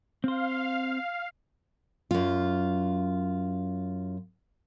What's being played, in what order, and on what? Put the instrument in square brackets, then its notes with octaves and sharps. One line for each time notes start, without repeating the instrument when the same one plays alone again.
[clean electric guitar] C4 C5 [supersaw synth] F5
[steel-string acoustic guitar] F#2 F4